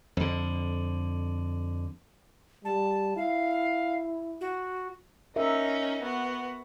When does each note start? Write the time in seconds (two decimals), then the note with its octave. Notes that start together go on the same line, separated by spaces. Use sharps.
0.17 F2 D3
2.65 G3 A5
3.17 E4 F5
4.41 F#4
5.36 C#4 D#4 A#4 E5
6.02 B3 F#4